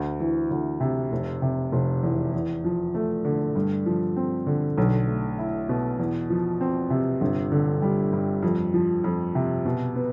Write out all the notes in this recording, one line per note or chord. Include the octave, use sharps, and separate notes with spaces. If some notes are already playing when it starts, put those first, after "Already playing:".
Already playing: D2
E3
D2
C3
F1
C3
F1
E2
E2
F3
A3
D3
G2
F3
C4
D3
B1
A3
E4
B2
E2
F3
C4
C3
G1
D3
G3
G2
F2
F3
F2
C3
B2
B3